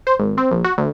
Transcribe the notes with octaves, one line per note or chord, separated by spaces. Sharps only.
C5
G#1
C4
A#1
F#4
D2